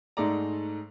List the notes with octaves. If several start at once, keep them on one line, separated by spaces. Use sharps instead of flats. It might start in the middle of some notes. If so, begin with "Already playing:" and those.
G#2 G#3 A3 A4 D5 A#5